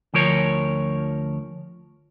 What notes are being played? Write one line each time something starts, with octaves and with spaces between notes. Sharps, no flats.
D2 F3 A#4 C#5